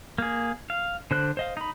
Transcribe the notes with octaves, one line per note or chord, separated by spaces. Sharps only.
A#3 G#4
F5
D3 C5 F#6
C5 D#5 F5
D#4 B5